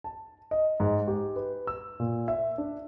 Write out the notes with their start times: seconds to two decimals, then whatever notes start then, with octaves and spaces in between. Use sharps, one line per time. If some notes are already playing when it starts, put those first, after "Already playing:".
0.04 A5
0.51 D#5
0.80 G#2
1.08 G4
1.36 B4
1.67 E6
2.00 A#2
2.28 E5
2.58 D4